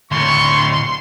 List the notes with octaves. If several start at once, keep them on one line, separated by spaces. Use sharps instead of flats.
D2 A2 C6 C#6